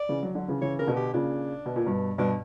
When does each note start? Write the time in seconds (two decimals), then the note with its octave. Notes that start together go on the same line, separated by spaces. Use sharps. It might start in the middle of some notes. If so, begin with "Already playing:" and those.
Already playing: D5
0.09 C#3 E3
0.23 D3 F#3
0.35 D3 F#3
0.48 C#3 E3
0.61 C#3 E3 C#5
0.79 C#3 A#4
0.87 B2 D3
0.97 G4
1.13 A#2 C#3 D4
1.66 B2
1.76 A#2
1.86 G2 B2
2.18 G2 B2 D4